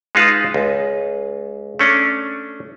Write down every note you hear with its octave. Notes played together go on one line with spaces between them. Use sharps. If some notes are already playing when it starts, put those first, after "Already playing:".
G#3 D#4 F4 B4 A5
C#2
A3 C#4 D4